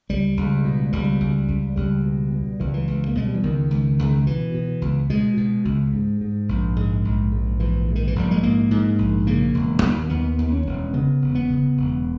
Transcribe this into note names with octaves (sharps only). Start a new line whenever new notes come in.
C#2 G3
C#2
B2
C#2 G3
C#2
C#2
C#2 G3
B2
B2
C#2 E3
G3
E3
C#2
A#3
B2 G#3
G3
E3
C#2 D#3
C#2
C#2
B2 E3
B2
C#2
B2 G#3
B2
C#2
G#2
G#2
A#1
G#2 G#3
A#1
G#2
A#1 E3
G#2
D#3
E3
A#1 G3
G#3
G#2 A#3
G#2
A#1
C#3 A#3
E1
D#2
D#2 B3
D#2
C#4
E1
C#3 B3
E1
B3
C#3
E1